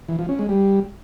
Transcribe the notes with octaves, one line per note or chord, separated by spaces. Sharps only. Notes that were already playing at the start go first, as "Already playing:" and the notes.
E3
F3
C#4
G#3
G3